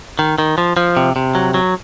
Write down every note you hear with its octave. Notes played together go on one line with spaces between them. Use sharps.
D#3
D#3
F3
F3
C3
C3
F#3
F#3